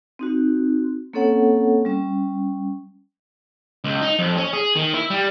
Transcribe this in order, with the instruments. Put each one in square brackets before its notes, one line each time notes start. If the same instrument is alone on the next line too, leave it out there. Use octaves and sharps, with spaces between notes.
[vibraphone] C4 D#4 F#4
A#3 C4 C#4 A4 C#5 F#5
G3 C#4
[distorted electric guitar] C#2
D#4
F2
C#4
G#4
D#3
E4
G3